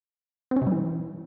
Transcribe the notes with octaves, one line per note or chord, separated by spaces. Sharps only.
C4
C#4
C3
G3
E3